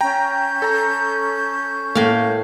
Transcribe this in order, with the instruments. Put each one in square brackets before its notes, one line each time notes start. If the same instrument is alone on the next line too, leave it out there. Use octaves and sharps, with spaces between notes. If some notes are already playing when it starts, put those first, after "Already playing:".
[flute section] C#4 G6 [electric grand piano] G5 A#5
[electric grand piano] A4 A#5
[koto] A2 F5 [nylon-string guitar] A#3